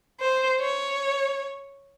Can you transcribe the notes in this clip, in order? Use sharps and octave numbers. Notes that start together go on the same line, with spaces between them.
C5
C#5